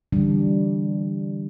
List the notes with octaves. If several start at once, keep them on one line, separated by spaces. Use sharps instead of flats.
D3 E3 G3 D4